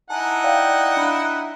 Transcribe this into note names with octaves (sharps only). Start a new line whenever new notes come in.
D#4 E4 F#5 G#5 A5
D5 F5 G5
D4 B5